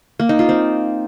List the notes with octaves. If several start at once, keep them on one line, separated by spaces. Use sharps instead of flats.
A#3
D#4
F4
C4